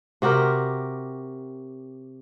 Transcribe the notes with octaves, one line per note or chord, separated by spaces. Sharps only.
C3 F#4 G4 A#4